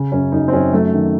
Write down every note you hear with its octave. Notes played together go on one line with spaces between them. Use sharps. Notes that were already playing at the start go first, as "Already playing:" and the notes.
Already playing: C#3
F#2 C#4
F#2 D#4
C4
F#2 C#4
F#3 A3
D#3